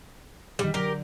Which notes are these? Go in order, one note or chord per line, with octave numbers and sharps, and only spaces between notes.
D#3 E3 G3 D4
D3 F#3 G4 A#4